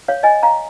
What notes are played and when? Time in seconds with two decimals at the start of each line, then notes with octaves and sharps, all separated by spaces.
0.08 C#5 F5
0.23 D#5 G#5
0.43 F5 A#5